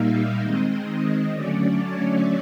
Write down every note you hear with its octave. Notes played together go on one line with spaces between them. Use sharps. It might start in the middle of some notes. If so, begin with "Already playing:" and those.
Already playing: A#2 G3 A#3 D#4 E5 F5
D#3 G#3 C4 D#5
D3 F#3 A3 C#4 D5
C#5